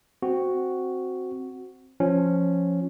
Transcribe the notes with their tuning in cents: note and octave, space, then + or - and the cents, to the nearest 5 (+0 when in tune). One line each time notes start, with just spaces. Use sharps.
C4 +0 F#4 +0
F3 +0 C#4 +0